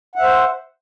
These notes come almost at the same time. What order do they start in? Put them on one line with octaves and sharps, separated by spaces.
F#5 E5 C5